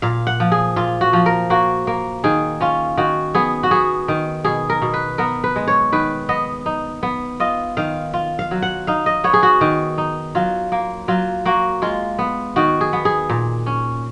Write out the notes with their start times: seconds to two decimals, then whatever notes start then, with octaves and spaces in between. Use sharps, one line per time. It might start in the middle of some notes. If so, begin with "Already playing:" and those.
0.02 A#2 F5
0.27 F#5
0.40 F3
0.52 G#4
0.76 A#2 F4
1.01 F#4
1.13 F3
1.26 A#4
1.50 A#3 F#4
1.87 A#3
2.24 D#3 G#4
2.61 C#4 F4
2.98 D#3 F#4
3.35 B3 G#4
3.63 F#4
3.71 B3 G#4
4.08 D#3
4.44 B2 G#4
4.70 A#4
4.82 B2
4.94 B4
5.18 B3 A#4
5.44 B4
5.56 G#3
5.68 C#5
5.92 D#3 B4
6.29 B3 D#5
6.66 D#4
7.03 B3
7.40 F4 D#5
7.77 D#3 F5
8.14 F4
8.39 F5
8.51 F#3
8.62 F#5
8.87 D#4 F5
9.06 D#5
9.24 B3 C#5
9.33 G#4
9.43 F#4
9.61 D#3
9.98 D#4
10.35 F#3 F4
10.72 A#3
11.08 F#3 F4
11.46 A#3 F#4
11.82 G#3 F4
12.19 B3
12.56 D#3 F#4
12.81 G#4
12.93 B3
13.05 G#4
13.30 A#2
13.66 C#4